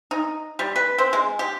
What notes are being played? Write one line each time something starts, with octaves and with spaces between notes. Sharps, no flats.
D#4
G3
B4
C4
G#3
G4